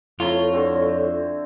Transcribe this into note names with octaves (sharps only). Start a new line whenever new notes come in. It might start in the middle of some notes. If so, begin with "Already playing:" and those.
F2 A3 E4 F4 C#5 A#5
D3 C4 F#4